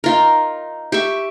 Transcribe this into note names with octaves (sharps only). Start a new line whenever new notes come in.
D#4 F4 A#4
G4 E5 C#6